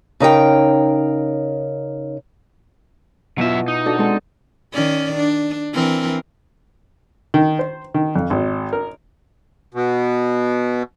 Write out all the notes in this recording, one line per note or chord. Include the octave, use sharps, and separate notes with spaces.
C#3 D#4 A#4 G5
B2 F#3 E4 F4 E5
D#4
D4 F#4 A4
G#3 C4 A4
D#3 C#4 D5
D4
E3 C4 A#4
D#3
C5
D#3
F2
G#1
A#4
B2